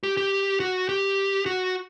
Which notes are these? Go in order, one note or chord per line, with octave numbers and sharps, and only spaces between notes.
G4
G4
F#4
G4
F#4